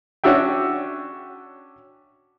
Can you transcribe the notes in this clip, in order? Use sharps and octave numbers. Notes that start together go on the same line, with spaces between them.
C#4 D4 F#4 E5 G5